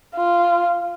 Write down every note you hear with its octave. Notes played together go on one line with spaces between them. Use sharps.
F4